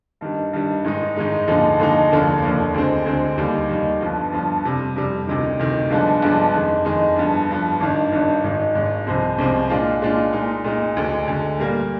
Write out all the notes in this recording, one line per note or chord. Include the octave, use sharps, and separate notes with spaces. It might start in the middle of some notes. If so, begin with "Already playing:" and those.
G2 D#3 G3
G2 D#3 G3
G#2 D#3 G#3 D#4
G#2 D#3 G#3 D#4
D#2 D3 F3 G#3 D#4
D#2 D3 F3 G#3 D#4
F1 D#2 D3 F3 A#3
F1 D#2 D3 F3 A#3
D2 D3 G#3 C4
D2 D3 G#3 C4
D#2 D#3 G3
D#2 D#3 G3
G1 G2 F3
G1 G2 F3
F2 C3 G3
F2 C3 G3
D2 C3 D#3
D2 C3 D#3
G1 G2 F3 G#3 D4
G1 G2 F3 G#3 D4
F2 D#3 G#3
F2 D#3 G#3
G1 G2 F3
G1 G2 F3
G#1 G2 D#3
G#1 G2 D#3
G#1 G#2 D#3
G#1 G#2 D#3
C2 C3 F3 G#3 C4
C2 C3 F3 G#3 C4
A#2 G#3 D4 F4
A#2 G#3 D4 F4
A#2 G#3 D#4
A#2 G#3 D#4
D2 D3 G#3
D2 D3 G#3
A#2 G3 A#3